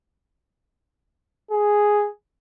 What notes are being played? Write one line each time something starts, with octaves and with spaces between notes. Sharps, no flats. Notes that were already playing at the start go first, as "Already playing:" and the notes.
G#4